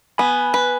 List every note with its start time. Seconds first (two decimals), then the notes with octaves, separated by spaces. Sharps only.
0.18 B3 G#5 B5
0.54 B4